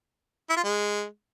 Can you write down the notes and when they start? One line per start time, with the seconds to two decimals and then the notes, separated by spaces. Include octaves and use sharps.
0.49 E4
0.56 F4
0.63 G#3